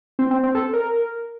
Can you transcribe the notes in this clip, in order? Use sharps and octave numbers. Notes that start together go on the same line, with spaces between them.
C4
C4
C4
A4
A#4